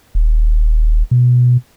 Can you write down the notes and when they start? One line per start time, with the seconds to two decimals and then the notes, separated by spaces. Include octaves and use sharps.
0.15 D#1
1.11 B2